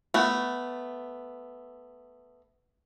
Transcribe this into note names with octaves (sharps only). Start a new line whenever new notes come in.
A3 B3